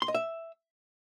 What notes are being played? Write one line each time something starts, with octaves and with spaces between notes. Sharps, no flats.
C6
D#5
E5